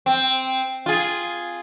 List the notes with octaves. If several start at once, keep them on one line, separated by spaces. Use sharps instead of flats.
C4
F4 G#4